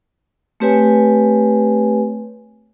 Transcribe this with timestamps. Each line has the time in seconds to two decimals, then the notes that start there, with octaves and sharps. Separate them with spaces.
0.60 A3 C4 G4 B4 C#5 G#5